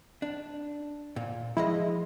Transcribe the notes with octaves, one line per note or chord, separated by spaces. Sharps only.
D4
A#2
F3 G#3 E4 D#5